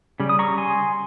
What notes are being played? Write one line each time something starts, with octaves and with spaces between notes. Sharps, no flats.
C#3 G3
D#6
A#5 C#6
G#5 C6